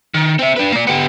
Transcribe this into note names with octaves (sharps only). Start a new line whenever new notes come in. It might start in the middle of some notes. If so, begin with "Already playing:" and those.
D#3
C4 E5
D4 B4
A#3 D5
B3 G4